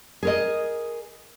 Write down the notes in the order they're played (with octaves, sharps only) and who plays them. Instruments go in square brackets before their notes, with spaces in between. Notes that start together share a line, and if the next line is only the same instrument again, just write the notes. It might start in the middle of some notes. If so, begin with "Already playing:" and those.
[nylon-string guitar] G#4 A#4 D#5